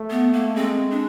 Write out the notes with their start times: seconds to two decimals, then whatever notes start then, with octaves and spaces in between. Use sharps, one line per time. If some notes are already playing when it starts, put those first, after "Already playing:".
Already playing: A3
0.10 B3
0.33 A#3
0.56 G#3 C4
0.91 D4